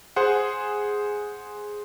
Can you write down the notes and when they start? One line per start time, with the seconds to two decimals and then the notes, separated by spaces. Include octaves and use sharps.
0.16 G#4 C5 F#5